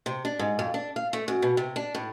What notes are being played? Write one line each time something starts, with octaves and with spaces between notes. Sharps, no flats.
C3
D4
G#2
F2
D4
F5
A3
F#2
B2
C3
D4
A2